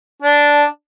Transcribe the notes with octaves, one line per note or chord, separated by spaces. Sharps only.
D4